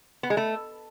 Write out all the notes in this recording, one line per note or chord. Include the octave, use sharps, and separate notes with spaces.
B3
G#3
A3